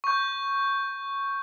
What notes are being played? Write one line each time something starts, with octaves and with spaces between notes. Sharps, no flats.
C#6 G6